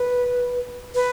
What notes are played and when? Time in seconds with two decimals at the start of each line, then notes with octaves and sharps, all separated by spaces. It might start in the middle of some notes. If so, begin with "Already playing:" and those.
Already playing: B4
0.95 B4